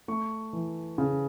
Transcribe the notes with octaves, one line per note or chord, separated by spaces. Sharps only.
A3 C#6
E3
C#3